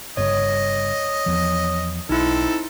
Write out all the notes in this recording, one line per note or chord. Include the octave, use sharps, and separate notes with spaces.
G1 G2 C#3 C#5 D#5
E2 F3
B1 C4 D#4 E4 A4